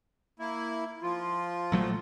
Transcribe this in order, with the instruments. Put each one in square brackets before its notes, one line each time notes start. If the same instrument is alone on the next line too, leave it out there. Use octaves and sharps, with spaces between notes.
[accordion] A#3 E4
F3 F4
[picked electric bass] A#1 F#3 A3